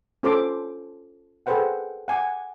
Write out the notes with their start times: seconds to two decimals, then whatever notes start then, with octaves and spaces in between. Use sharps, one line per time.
0.23 C#4 F4 A4 C5 C6 D6
1.46 G#4 A4 B4 C5 F#5 G5
2.08 F#5 G#5 D6